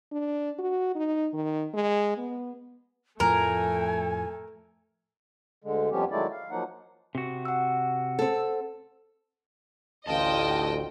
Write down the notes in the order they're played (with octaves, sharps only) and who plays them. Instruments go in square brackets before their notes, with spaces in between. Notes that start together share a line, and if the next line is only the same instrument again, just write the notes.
[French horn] D4
F#4
D#4
D#3
G#3
B3
[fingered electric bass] F2 A2 F3 [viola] A3 [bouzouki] A#4 [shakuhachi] G#5
[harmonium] D2 D3 G#3
F2 F3 G3 B3 C#4 G4
D#3 F#3 G#3 A3 E4 D5
F5
F3 F#3 A#3 D#4 F#5
[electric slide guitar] C3 F#4
[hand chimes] F#5 E6
[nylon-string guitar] C4 A4
[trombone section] A1 D2 [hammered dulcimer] F4 [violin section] D#5 G5 [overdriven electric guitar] A5